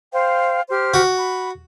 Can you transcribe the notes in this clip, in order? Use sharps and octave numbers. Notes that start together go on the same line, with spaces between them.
C5 F5 G5
G4 C5 F6
F#4
B5